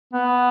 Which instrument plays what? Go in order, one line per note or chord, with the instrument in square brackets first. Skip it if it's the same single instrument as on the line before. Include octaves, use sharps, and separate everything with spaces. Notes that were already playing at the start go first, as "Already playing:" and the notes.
[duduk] B3